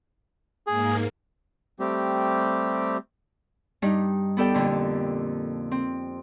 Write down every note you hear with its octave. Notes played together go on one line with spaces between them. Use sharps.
G#2 A#3 G#4
G3 A3 C4 G4
G2 G3 D#4
B3 E4 G4 A4 D5 G5
F2 A#2 D3
C4